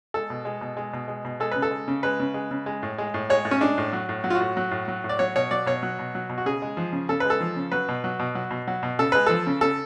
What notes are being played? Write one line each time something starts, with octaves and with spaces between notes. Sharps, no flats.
G#3 A4
B2
G#3
B2
G#3
B2
G#3
B2
G#3 A4
C#3 B4
A4
G#3
C#3
G#3 B4
C#3
G#3
C#3
G#3
A2
G#3
A2
G#3 C#5
A2
C#4
G#3 D4
A2
F#3
A2
F#3
F4
F#4
A2
F#3
A2
F#3
A2
D5
F#3 C#5
B2 C#5
F#3 D5
B2 C#5
F#3
B2
F#3
B2
F#4
C#3 G#4
G#3
F3
C#3
C#3 A4
G#3 B4
A4
F3
C#3
F#3 B4
B2
F#3
B2
F#3
B2
F#3
B2
C#3 A4
G#3 B4
F3 A4
C#3
C#3 A4